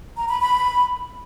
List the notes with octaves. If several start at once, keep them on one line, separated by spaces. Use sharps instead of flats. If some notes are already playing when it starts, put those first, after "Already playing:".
A#5
B5
B5